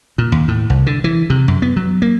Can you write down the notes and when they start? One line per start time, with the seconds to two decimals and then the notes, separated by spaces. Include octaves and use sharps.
0.18 A#2
0.32 D#2
0.48 A2
0.70 C2
0.86 D3
1.04 E3
1.30 C3
1.48 F#2
1.62 B3
1.76 F#3
2.02 A#3